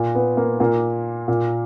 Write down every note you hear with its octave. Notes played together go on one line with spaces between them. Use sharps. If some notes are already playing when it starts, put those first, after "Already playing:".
Already playing: A#2
B3
A#3
A#2 A#3
A#2